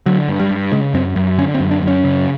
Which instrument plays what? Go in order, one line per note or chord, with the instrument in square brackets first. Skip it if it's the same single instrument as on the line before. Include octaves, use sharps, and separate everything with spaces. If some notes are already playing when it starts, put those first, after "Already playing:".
[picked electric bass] D3 F#3
G2
G3
G2
C#3 G#3
F#2 C4
F#2
D3 C#4
C4
F#2
D4
F#2
C#4
C#3